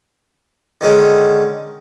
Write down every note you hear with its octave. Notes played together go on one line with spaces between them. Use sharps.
D3 D#3 G#3 C#4